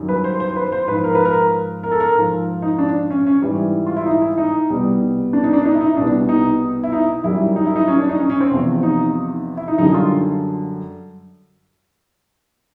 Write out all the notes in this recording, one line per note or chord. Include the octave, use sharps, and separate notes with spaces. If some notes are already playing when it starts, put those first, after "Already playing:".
Already playing: F#2 D#3 G3
B4
C5
C5
B4
C5
G#2 F3 B4
A#4
B4
A#4
A#4
A4
A#4
G#2 F3
D#4
D4
C#4
C#4
G#2 E3 G3
F4
E4
D#4
E4
D#4
C2 B2 G3
D4
D#4
D4
D#4
E4
D#4
C2 B2 G3 D4
D#4
E4
D#4
F#2 D#3 G3 E4
D#4
E4
D#4
C#4
D4
D#4
C#4
C#4
C4
E2 C3 F3
D#4
E4
D#4
F#2 D3 G3 D#4
F4